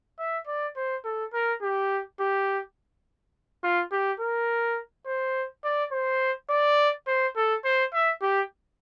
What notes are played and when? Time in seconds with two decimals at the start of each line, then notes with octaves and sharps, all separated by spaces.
0.19 E5
0.47 D5
0.76 C5
1.05 A4
1.33 A#4
1.62 G4
2.20 G4
3.64 F4
3.92 G4
4.20 A#4
5.06 C5
5.64 D5
5.92 C5
6.50 D5
7.07 C5
7.36 A4
7.64 C5
7.93 E5
8.22 G4